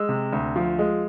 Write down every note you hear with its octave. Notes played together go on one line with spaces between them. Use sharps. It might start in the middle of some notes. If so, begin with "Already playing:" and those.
Already playing: G#3 E6
C3
D2
F3
G#3